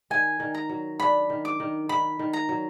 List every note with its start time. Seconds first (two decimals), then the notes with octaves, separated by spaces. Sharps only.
0.10 D#3 G#5
0.40 D#3
0.54 A#5
0.69 F#3
1.00 D4 B5
1.30 D#3
1.45 D6
1.60 D#3
1.89 D#3 B5
2.19 D#3
2.33 A#5
2.49 F#3